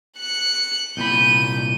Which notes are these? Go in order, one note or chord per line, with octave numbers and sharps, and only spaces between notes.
F#6 C#7
C2 A#2 B5 G6 D#7